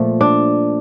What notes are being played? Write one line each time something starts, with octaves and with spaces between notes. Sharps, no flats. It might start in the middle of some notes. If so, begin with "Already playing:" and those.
Already playing: A#2 F3 A3
D4